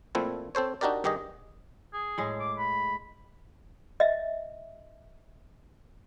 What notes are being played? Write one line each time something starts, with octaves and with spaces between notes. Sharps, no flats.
A#2 F3 A3 C4 E4
C4 A4 C5 C#5
D4 D#4 F#4 G4 A#4 D5
G2 D#3 G4 G#4 D#5
G#4
A2 G#3
D6
B5
D#5 E5